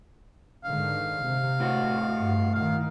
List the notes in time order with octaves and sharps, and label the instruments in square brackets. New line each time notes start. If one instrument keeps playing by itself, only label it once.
[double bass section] G#2 D3 D#3 [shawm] F5
[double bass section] C3
[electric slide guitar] A2 F#4
[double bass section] G2
[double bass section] D#3 [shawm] F5